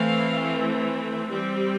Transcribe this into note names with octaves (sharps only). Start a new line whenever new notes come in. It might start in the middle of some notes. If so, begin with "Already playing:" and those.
Already playing: E3 A3 C4 F5
G3 C4